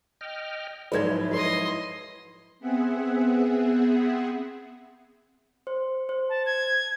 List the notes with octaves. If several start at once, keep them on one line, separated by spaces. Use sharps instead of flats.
D#5 G5 F6
G#2 F3 F#3 E4 B4 D5 G#6
B4 D#5 C6
B3 C4 G#4 E5 F#5
C5
C5
A5
G#6